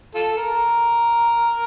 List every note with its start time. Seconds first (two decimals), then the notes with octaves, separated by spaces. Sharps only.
0.15 F4 A4
0.37 A#4